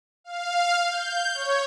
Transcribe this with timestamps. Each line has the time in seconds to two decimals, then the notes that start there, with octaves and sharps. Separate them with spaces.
0.24 F5
0.87 G6
1.34 C#5